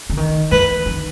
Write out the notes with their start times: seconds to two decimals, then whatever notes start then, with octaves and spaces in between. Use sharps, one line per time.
0.10 D3
0.17 D#3
0.51 E3 B4
0.86 D#3